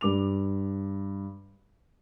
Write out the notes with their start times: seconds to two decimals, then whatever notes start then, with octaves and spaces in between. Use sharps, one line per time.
0.01 G2 D6 F7